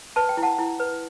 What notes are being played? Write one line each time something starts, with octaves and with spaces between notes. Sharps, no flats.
B4 A5
G5
E4
F#5 A5
E4
B4